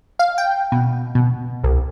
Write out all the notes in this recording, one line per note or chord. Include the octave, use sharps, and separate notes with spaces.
F5
G5
B2
B2
C2